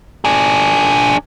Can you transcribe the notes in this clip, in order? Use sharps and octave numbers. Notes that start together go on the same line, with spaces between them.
D4 G#4